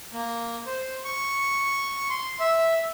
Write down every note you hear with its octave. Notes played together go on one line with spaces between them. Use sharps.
A#3
C5
C#6
C6
E5